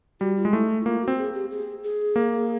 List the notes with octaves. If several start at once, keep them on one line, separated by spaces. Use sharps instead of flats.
G3 F#4
F4
G#3
A3 E4
E4
A#3 F4
F#4
C4
G#4
G4
G#4
G#4
A#3